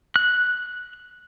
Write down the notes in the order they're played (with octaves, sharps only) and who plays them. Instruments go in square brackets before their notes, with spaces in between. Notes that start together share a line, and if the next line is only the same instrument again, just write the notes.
[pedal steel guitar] F#6